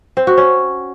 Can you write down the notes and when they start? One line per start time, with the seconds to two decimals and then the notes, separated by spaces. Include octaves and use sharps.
0.17 C4
0.27 F#4
0.37 C#4